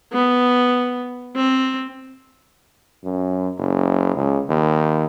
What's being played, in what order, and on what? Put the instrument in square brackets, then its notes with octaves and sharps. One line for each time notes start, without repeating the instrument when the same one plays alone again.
[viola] B3
C4
[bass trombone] F#2
F#1
C#2
D#2